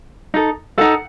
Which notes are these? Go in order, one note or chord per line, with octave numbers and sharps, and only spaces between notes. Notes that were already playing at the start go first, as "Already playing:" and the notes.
D#4 A4
D#4 A4 F#5